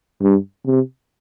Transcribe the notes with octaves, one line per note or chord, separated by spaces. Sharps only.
G2
C3